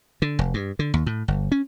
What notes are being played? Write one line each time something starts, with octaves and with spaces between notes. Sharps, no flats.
D3
F1
G2
D3
D#2
A2
G1
C#4